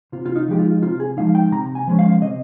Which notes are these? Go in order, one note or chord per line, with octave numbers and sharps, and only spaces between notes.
C3 F4
F4
D#4
F3 G#3 D#4 G4
F4
C3 F4
G#4
F3 G#3 D#4 F5
G5
C3 A#5
G#5
F3 G#3 C#4
F5
C3 D#5